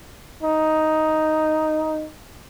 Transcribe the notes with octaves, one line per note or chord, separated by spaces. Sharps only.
D#4